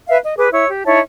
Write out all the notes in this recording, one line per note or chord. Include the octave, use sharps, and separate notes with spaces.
B4 E5 F5
D#5
G#4 B4 D6
E4 C#5 E6
G4
D#4 E4 C#5 A5